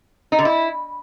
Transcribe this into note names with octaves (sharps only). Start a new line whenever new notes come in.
D#4
D3
E4